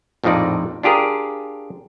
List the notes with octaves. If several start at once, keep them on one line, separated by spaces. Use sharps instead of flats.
A#1 F2 A2 F3 D#4 D5
D4 F4 G4 G#4 A#4